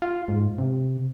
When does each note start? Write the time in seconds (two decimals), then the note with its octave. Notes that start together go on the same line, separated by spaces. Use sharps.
0.02 F4
0.28 G#2
0.58 C3